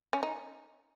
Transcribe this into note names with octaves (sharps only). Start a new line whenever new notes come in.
C#4
D#4